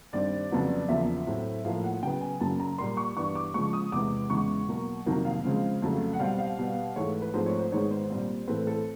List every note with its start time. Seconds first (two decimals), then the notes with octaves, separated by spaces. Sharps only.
0.13 G2 D#3 G3 C4 D5
0.51 F2 C#3 F#3 B3
0.88 E2 C#3 F3 A#3 E5
1.27 A2 F#3 A3 C4
1.65 A2 F3 A#3 F5
1.84 F#5
2.03 C#3 F#3 B3 G5
2.21 G#5
2.41 F#2 C#3 F#3 A#3 A5
2.60 A#5
2.78 A#2 G3 A#3 C6
2.97 C#6
3.16 G2 E3 G3 B3 C#6
3.35 D6
3.54 C#3 F3 G#3 C#6
3.73 D#6
3.92 E2 C3 E3 G#3 B3 D6
4.30 E2 C#3 E3 G#3 C#6
4.69 B2 F#3 A#3
5.06 F2 C3 D#3 F#3 A#3
5.25 F5
5.45 C#3 F3 G#3 C4
5.82 F2 C#3 F#3 A3
6.13 F#5
6.19 B2 G3 C4 F5
6.39 F5
6.59 B2 G3 B3
6.96 G#2 E3 A3 C#5
7.08 B4
7.22 B4
7.34 G#2 F3 A3 C4 C5
7.46 C#5
7.59 C5
7.72 G#2 D#3 G#3 B3 C#5
7.91 C5
8.10 A#2 G3 C4
8.48 A2 E3 A3 C4 B4
8.67 A4